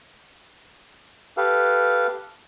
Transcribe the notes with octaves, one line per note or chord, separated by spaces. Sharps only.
G4 A4 B4 F5